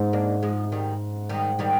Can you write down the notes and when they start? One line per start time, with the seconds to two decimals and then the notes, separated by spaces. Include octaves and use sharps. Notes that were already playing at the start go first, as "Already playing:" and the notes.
Already playing: G#2
0.13 A#3 D4
0.43 F3 G#3
0.72 D#3 G3
1.29 D#3 G3
1.59 D#3 G3